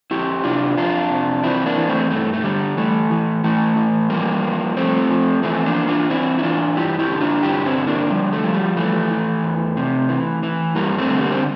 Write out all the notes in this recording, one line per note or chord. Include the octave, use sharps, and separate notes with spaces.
F2 E4 G4
C3 D4 F4
F2 D4 F4
C3
E3 C4 E4
A#3 D4
E3
A3 C4
G2 A3
A3
D3 G3
E3 A3
E3
E3 A3
E3
F3 G3 A#3
F3
F3 A3 C4
F3
E3 A3 C4
A#3 D4
E3
D4 F4
F4
E3 C4 E4
E4
E3 D4 F4
G2 E4 G4
E4 G4
D3
D4 F4
G2 E4 G4
C4 E4
D3
A#3 D4
F3 G3
A3
F3
G3
E3 A3
E3
E2
C3
E3
E3
G2 G3 A#3
A3 C4
D3
G3 A#3
C4